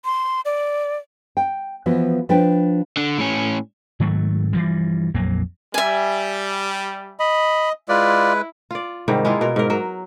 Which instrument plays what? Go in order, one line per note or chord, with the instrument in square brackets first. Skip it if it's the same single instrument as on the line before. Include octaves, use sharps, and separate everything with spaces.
[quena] C6
D5
[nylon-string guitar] G5
E3 F3 B3 F#4
F3 D4 B4 G5
[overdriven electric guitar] D3
A2 C#4
[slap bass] G#2 D#3 F#3 A3
G2 E3 F3 G3
A#1 F2 F#3 A#3
[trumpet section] G3 [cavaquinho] E5 G#5
[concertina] D#5 [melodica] B5
[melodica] G#3 B4 [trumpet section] E4 [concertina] F4 D5
[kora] F4 D5
G#2 C3 D#3 G3
G#3 A#3 E4 F4
B2 A#4
G#2 A#4
F#3 A#4